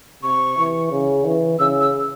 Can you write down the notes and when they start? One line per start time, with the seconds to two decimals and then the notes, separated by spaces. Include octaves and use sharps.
0.23 C3 C#6
0.57 E3
0.91 C#3
1.25 E3
1.59 C#3 E6
1.81 E6